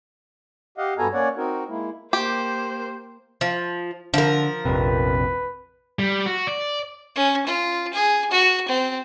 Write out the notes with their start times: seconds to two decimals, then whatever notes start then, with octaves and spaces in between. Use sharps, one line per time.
0.78 G4 D#5 F5 F#5
0.98 G2 B3 F#4 A4 G#5 A#5
1.13 A#3 C#4 C#5 D5 F#5
1.37 C4 D#4 F#4 A#4
1.69 G#3 A#3 E4
2.13 A#3 G4 C5
3.41 F3
4.14 D3 F3 A#4
4.65 A#1 F2 C3 B4
5.99 G3
6.26 F#4
6.47 D5
7.15 C#4
7.46 F4
7.93 G#4
8.31 F#4
8.68 C4